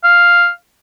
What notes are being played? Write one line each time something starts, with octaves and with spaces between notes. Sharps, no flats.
F5